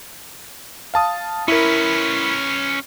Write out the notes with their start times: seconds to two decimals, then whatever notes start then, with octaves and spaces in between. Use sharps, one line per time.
0.94 F5 A5 D#6
1.48 C#4 E4 A#4 B4